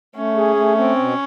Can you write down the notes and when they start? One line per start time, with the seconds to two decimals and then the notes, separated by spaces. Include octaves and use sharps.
0.16 A3 C#4
0.36 G#4
0.56 A3
0.77 C4
0.98 B2